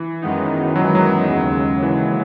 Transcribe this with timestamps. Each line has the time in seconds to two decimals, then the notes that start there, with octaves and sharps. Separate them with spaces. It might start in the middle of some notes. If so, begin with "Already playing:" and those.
Already playing: E3
0.22 F#2 D#3 G#3 B3 D#4
0.76 F#3
0.85 E3
0.95 F#3
1.29 D#2 C#3 G#3
1.83 E3